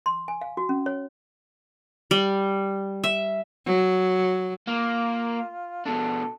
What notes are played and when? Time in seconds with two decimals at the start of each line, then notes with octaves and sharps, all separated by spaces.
0.06 C6
0.28 G#5
0.41 F5
0.57 F#4
0.69 C#4
0.86 C#5
2.11 G3
3.04 E5
3.66 F#3
4.68 A#3 F4
5.85 B2 D4 A4